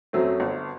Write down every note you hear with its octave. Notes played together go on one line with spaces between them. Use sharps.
F#2 F#3 A3 C4
G1